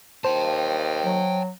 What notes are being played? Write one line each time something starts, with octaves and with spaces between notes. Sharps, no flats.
D#2 C5 G5 A5
F#3